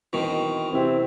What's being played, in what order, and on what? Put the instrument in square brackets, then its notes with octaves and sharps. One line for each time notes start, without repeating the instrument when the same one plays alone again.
[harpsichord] B2 D#3 [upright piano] E3 C4
[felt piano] C3 [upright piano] E3 E4 [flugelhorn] C4